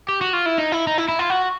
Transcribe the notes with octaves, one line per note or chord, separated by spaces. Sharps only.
G4
F#4
F4
E4
D#4
E4
D#4
E4
E4
F4
F#4